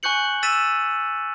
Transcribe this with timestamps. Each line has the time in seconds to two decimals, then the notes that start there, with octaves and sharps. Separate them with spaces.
0.03 G#5 C#6 F#6 G6 C#7 F#7
0.43 E6 A6 B6 D#7 E7